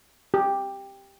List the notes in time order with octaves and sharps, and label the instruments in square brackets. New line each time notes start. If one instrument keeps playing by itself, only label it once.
[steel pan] G4